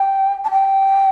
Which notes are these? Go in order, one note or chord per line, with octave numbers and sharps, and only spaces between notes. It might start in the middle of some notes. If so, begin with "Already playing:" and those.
Already playing: G5
A5
G5